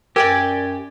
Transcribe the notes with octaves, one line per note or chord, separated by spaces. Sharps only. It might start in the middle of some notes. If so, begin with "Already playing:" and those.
F#2 G4 A#4 D5 G5 G#5